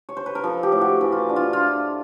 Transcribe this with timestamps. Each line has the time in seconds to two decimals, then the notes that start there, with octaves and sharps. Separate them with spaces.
0.09 C#5
0.17 C5
0.26 B4
0.35 A#4
0.44 F3 A4
0.63 G4
0.72 A2
0.81 F#4
1.01 E3 F#4
1.12 F4
1.29 D4
1.36 F4
1.53 F4